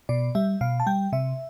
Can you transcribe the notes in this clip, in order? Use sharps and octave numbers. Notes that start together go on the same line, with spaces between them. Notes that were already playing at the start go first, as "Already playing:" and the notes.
B2 D5
G3 E5
B2 F5
A5
G3 G5
C3 E5